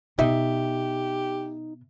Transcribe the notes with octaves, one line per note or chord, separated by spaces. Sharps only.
B2 D#4 G4 E5